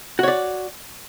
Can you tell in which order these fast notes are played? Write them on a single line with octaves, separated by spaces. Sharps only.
F#4 C#5 D5